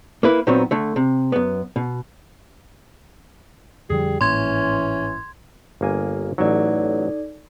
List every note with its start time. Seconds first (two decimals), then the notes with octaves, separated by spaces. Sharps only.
0.23 A#3 E4 B4
0.47 A#2 D#3 F#3 B3 C4
0.71 D3 A3
0.96 C3
1.32 F#2 B3
1.76 B2
3.90 F2 D3 F3 G3 G#4
4.21 G#1 A2 E3 A#3 C#4 C6 G#6
5.81 G1 A#3 G#5
6.38 A1 F#3 D#4 A4 D5